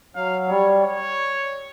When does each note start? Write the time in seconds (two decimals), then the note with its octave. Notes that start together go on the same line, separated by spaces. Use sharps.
0.16 F#3 F5
0.48 G3 C#5
0.82 C#5